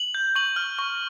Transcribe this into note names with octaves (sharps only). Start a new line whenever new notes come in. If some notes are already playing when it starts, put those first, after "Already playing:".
Already playing: F#7
G6
C#6 F#7
F6
C#6